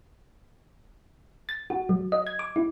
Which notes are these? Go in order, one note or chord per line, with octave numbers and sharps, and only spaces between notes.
A6
F#4
F#3
D#5
G#6
D6
E4